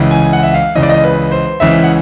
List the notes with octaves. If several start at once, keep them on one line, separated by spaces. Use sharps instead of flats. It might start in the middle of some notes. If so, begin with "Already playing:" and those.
Already playing: C#2 C#3 E3
G#5
F#5
E5
F5
C#2 C#3 E3 D#5
D5
D#5
B4
C5
C#2 C#3 E3 E5
F#5